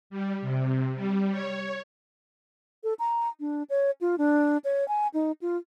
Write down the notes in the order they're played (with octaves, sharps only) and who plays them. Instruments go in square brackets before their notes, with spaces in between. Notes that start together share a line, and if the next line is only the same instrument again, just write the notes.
[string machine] G3
C3
G3
C#5
[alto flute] A4
A#5
D4
C#5
F4
D4
C#5
G#5
D#4
F4